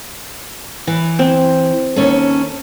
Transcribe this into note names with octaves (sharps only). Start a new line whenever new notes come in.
E3
C4
D#2 C#4 A4